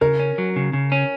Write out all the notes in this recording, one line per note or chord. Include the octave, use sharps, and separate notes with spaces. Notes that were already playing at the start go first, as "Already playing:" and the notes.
C#3 A#4
C#4
F#3
C#3
C#3
C#4